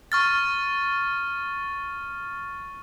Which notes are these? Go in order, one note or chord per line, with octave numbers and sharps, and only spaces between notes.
C#6 F6 A6